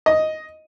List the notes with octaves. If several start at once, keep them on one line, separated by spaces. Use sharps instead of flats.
D#5